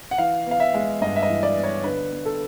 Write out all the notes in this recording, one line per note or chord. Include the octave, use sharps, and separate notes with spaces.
F#5
E3 F5
B3 F5
E5
G#3
G2 D#5
E5
D#5
E3
D5
B3
C#5
D3 B4
B3
A4